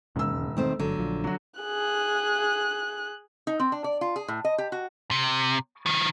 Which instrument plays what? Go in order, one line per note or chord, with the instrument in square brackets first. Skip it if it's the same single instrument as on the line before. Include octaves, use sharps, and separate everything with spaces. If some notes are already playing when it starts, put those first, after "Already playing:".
[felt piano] E1 E6 [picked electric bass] D#2 G#2 C#3
[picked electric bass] D#3 [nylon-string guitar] A3 C4 C5
[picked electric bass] G1 [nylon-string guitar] D3 [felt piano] F#3
[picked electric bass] A#1 F3
[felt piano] F#3 F#4
[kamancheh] G#4 F#6
[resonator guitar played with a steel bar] D#4
C4
D4
D5
F4
G#4
A2
D#5
G4
F#4
[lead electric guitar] C3
D#3 F3